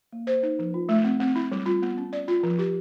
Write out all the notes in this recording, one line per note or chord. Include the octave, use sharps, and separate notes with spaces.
A#3
C5
D#4
F3
F4
A3
C4
C4
E4
G3
F4
B3
C#4
D5
F4
F3
G4